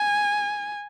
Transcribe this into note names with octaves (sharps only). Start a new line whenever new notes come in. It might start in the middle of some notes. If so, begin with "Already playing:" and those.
Already playing: G#5